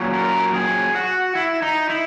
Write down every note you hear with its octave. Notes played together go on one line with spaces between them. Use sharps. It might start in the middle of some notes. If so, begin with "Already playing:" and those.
Already playing: A#2 F#3 C#4
A#4
G#4
F#4
E4
D#4
E4